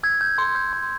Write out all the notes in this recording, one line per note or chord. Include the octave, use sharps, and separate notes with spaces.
E6 G#6
G6
C6
G6
C6